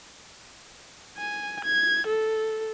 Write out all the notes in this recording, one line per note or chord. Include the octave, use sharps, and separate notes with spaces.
G#5
G#6
A4